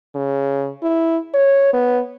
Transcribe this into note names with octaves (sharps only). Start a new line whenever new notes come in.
C#3
E4
C#5
B3